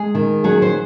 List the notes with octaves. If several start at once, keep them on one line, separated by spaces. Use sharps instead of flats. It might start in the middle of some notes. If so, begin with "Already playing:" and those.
Already playing: G#3 G#4
D#3
F#3 G#4
C5